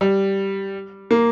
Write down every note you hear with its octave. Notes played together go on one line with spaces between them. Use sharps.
G3
A#3